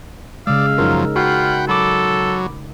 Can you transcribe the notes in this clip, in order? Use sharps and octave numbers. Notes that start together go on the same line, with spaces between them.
C#3 G#3 D5 F5 E6
F#2 F3 D#4 A#4
F4 F#4 F#5 G5 B5
F#3 A4 B5 D6